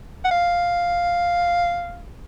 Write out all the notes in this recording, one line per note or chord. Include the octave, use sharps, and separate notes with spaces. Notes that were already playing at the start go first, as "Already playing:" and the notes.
F#5
F5